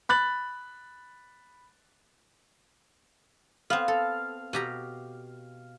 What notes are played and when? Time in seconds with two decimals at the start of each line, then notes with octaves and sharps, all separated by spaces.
0.09 B5 F#6 A6 F#7
3.70 B3 C4 F5
3.88 A4
4.53 B2 G4 A#5